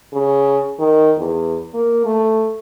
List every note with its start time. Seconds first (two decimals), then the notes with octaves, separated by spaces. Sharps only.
0.13 C#3
0.79 D#3
1.17 E2
1.74 A#3
2.05 A3